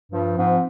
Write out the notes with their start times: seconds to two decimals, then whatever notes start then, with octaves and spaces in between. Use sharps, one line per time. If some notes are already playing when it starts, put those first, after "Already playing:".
0.12 G2 F3
0.37 G#2 C4